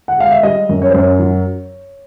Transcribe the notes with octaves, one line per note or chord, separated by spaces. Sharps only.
F#5
G#3 F5
E5
G3 D#5
F#2
C#5
C5
F#2 C#5
F#3